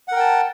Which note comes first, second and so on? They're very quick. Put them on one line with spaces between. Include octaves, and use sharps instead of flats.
F#5 A#4 G5 A5